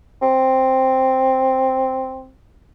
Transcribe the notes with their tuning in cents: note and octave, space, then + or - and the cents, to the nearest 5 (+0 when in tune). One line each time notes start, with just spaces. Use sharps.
C4 +5